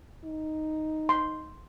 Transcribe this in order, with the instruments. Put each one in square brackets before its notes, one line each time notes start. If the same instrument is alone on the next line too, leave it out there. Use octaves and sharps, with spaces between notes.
[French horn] D#4
[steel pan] C6